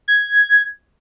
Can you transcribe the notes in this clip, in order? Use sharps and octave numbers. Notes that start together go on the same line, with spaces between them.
G#6